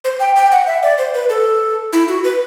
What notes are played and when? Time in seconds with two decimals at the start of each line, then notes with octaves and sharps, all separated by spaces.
0.04 C5
0.20 G5
0.36 G5
0.52 F#5
0.67 E5
0.83 D5
0.98 C5
1.14 B4
1.30 A4
1.93 E4
2.08 F#4
2.24 B4